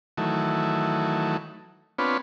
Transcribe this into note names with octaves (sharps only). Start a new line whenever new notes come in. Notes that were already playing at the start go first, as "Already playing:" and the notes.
D#3 E3 F#3 A3
B3 C4 D4 F4 B4 C#5